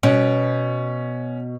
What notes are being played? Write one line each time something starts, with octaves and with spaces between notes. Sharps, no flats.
B2 C#4